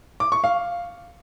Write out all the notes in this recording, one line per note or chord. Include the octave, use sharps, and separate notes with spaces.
D6
C#6
F5